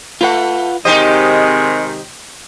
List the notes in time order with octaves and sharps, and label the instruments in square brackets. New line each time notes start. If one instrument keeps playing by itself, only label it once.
[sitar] A3 [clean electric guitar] F4 B4 F#5
[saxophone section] C3 D#3 G#3 [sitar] D#4 G4 C5 [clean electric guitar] D#5